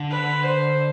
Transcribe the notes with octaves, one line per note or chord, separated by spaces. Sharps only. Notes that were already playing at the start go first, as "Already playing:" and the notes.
Already playing: D3
B4
C5